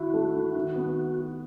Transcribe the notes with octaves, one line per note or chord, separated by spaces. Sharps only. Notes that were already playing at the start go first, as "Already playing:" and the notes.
Already playing: D#3 E4 F#4
A3
D#3
D#3
B3